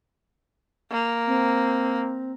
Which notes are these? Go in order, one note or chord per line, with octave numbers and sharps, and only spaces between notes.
A#3
C4